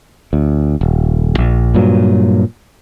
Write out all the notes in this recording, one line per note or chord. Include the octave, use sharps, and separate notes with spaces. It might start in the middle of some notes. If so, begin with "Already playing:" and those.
D2
D#1
A#1
G2 A#2 F#3